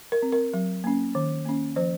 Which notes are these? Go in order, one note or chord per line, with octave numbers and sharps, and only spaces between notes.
A#4
C4
A#4
F#3
A#3 C#4
D#3
A#3 C#4
F3 C5